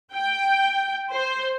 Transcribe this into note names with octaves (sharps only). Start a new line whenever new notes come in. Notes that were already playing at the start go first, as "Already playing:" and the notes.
G5
C5